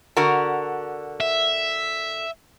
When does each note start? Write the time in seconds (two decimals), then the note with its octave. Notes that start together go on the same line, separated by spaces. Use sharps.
0.17 D3 F#4 A#4
1.20 E5